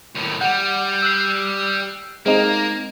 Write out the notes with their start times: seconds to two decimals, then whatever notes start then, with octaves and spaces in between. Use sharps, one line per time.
0.15 D#2 A2
0.41 G3 F#5
1.02 E6 F#6 C7
2.26 G#3 A#3 C4 D#4